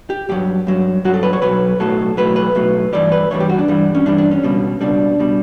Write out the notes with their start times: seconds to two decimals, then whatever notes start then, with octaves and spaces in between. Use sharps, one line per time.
0.10 G4
0.29 G2 F#3 G4
0.67 G2 F#3
1.04 G2 F#3 F#4
1.14 A4
1.23 B4
1.33 C#5
1.42 B1 A2 F#3 B4
1.80 B1 A2 F#3 A4
2.17 B1 A2 F#3 B4
2.36 B4
2.55 B1 A2 F#3
2.93 G2 E3 G3 D5
3.12 B4
3.31 G2 E3 G3 C#5
3.40 G4
3.49 F#4
3.59 D4
3.68 G2 E3 G3
3.95 C#4
4.06 G2 E3 G3 D4
4.18 D4
4.31 C#4
4.43 C#2 B2 G3
4.81 C#2 B2 G3 D4
5.20 B2 G3